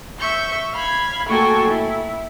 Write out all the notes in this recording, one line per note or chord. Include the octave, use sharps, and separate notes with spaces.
E5 C#6 G6
F5 B5 G#6
A3 A#3 F#4 A4 G5 G#5
E4